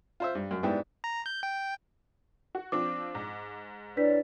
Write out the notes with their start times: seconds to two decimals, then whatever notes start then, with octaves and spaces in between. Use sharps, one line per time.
0.20 F4 C5 E5
0.35 G2
0.51 F#2
0.63 G#2 G3 B3 D4 E4 G5
1.04 A#5
1.26 G6
1.43 G5
2.55 F#4
2.72 F3 C4 D4 D6
3.15 G#2
3.97 D4 E4 B4 C#5 D5 B6